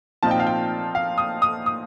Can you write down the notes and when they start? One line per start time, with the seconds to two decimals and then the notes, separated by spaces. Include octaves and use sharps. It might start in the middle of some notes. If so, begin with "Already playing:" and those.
0.23 A#2 F3 C4 D#4 A5
0.31 G5
0.40 F5
0.47 G5
0.95 F5
1.18 D#6
1.42 D#6
1.66 D#6